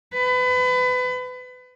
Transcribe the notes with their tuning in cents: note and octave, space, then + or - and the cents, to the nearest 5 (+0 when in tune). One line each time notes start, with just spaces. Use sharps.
B4 +30